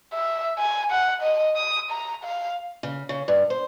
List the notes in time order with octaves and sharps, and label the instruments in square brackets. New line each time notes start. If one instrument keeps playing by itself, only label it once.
[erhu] E5
G#5
F#5
D#5
D#6
A#5
F5
[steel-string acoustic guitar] C#3
C#3
G2
C5